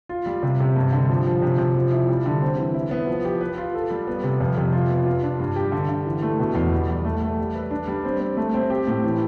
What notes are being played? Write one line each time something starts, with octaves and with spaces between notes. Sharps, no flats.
F4
G3
C3
C3
G2
D3
F3
F3
C3
C3
F3
E4
G3
D3
C4
E3
E4
B3
F3
G4
B4
F4
A4
G3
B3
C3
F2
C3
F4
B3
F4
D4
G2
G4
D3
D3
E3
A3
B2
E2
G3
E2
A3
A3
G3
B4
D4
G3
C4
C4
A3
C4
G4
A2
E3